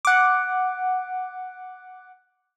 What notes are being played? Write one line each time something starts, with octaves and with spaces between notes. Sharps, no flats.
F#5 D6